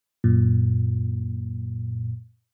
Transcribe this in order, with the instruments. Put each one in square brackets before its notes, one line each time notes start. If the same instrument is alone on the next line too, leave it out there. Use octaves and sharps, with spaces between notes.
[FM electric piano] F#2 A#2